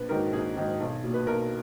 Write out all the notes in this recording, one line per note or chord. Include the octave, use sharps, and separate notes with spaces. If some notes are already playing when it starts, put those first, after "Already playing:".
Already playing: A#1 B4
G#2 D#3 F#3 A#4
A#1 G#4
G#2 D#3 F#3
B1
A#2 F#3
B4
B1 A#4